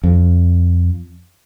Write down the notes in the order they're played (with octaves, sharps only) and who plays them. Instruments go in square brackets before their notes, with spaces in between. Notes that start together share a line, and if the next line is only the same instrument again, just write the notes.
[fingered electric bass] F2